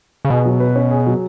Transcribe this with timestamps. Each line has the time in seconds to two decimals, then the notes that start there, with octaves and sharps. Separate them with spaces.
0.25 C#3
0.30 B2 G#4
0.46 F#3
0.60 B4
0.76 C#4
0.91 G#4
1.07 F#3